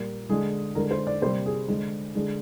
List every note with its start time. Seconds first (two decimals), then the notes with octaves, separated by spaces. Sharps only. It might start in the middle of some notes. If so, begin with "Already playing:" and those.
Already playing: A#2 G3 A#3
0.29 D3 G#3 G#4
0.75 D3 G#3 A#4
0.91 C5
1.07 D5
1.21 C3 G3 A#3 C5
1.46 G#4
1.68 D3 G#3
2.15 D3 G#3 G#4